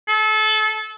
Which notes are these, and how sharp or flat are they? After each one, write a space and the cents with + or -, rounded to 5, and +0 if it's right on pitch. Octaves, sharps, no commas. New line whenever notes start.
A4 -30